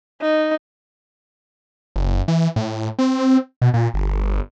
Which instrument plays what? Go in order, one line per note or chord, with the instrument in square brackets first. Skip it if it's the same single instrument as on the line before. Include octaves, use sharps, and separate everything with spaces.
[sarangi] D#4
[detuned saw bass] F#1
E3
A2
C4
B2
A#2
G1